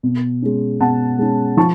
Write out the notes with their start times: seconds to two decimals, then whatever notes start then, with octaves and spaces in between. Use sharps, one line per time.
0.03 B2
0.42 G#3 C#4
0.80 B2 F#5 A5
1.19 G#3 C#4
1.57 F3 A5 C#6